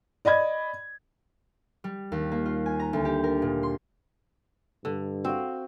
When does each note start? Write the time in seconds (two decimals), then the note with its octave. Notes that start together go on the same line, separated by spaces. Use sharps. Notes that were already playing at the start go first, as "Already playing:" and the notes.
0.25 D5 D#5 B5 G#6
1.84 G3
2.12 D#2
2.32 A#3
2.46 F4
2.66 G#5
2.79 A#5
2.93 D2
3.05 G4
3.24 A#4
3.42 A#2
3.63 C6
4.85 G2 D3
5.25 C4 F#4 F5